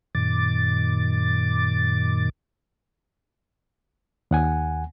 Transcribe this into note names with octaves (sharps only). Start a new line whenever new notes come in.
F#2 A#2 D#3 D6 A6
D#2 F#5 G#5